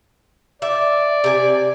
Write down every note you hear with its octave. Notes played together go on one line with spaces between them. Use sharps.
D5 E5
C3 G#5